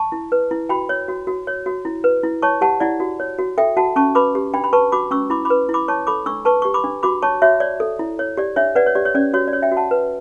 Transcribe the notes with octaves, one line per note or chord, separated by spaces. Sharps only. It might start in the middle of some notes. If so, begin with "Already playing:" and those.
Already playing: A5 C#6
E4
B4
E4
F#4 G5 B5
C#5
F#4
F#4
C#5
F#4
E4
B4
E4
C#5 A5 C#6
G4 F#5 A5
E4 D5 F#5
F#4
C#5
F#4
A4 E5 G5
F#4 F#5 A5
C#4 A5 C#6
B4 B5 D6
G4
D4 G5 B5
B5
B4 A5 C#6
F#4 B5 D6
C#4 C#6 E6
E4 B5 D6
B5 D6
B4
E4
B5 D6
C#5 A5 C#6
A4 B5 D6
D4 C#6 E6
B4 A5 C#6
G4 C#6
B5 D6
D4
F#4 B5 D6
C#5 A5 C#6
F#4 C#5 E5
C#5 D5
A4
E4
C#5
G4 D5
D4 C#5 E5
B4 D5 F#5
C#5
G4 D5
C#5
C#4 D5
F#4 C#5
D5
C#5
E5 G5
F#4
F#5 A5
B4